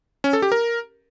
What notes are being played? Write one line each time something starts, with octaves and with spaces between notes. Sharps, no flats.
C#4
A4
G4
A#4